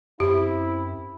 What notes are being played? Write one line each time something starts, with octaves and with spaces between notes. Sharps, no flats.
F#2 C4 E4 G4